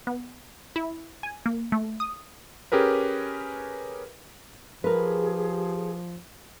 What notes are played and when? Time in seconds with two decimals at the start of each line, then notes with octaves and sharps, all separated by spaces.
0.07 B3
0.76 E4
1.23 G#5
1.46 A#3
1.72 A3
2.00 D#6
2.72 C#4 G4 G#4 A#4 B4
4.84 F3 G4 G#4 A#4 B4